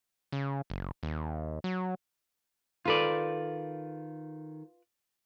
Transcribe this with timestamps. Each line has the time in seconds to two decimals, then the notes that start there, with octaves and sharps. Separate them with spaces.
0.32 C#3
0.70 F#1
1.03 D#2
1.64 F#3
2.85 D#3 F4 A4 B4 D5